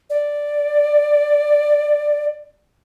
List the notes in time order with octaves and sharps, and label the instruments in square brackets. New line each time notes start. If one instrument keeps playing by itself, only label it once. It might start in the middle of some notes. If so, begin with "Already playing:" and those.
[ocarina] D5